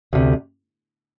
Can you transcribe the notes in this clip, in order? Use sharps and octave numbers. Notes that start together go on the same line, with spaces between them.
D2 C3